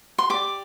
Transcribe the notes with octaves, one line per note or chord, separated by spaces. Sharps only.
C6
G4 D5 D6